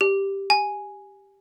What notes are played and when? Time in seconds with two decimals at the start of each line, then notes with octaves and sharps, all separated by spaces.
0.01 G4
0.50 G#5